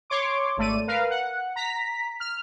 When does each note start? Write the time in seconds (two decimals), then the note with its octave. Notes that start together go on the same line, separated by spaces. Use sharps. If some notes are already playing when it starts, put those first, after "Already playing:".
0.10 C#5 C6 D6
0.57 G#1 A3 D5 D#7
0.87 A#4 B4 F5
1.10 F#5
1.56 A#5 B6
2.20 F6